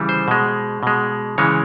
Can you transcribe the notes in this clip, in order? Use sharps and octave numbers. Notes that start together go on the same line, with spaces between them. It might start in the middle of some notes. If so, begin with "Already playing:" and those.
Already playing: C#3 E3 G3
C5
B2 G#3
B2 G#3
C#3 E3 G#3 C#5